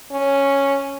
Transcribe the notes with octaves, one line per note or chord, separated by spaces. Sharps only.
C#4